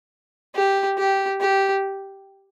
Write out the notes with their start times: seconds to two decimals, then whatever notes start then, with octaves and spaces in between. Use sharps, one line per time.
0.55 G4
0.98 G4
1.41 G4